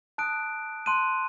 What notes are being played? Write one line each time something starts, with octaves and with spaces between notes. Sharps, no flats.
A5 D#6 F#6 D7
A5 C6 F#6 D#7